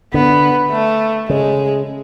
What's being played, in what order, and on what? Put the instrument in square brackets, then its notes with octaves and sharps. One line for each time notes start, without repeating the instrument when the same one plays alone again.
[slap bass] D3 [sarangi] B3
[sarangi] A3
[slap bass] C#3 [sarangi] G#3